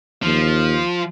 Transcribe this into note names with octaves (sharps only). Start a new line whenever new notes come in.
D#2 F3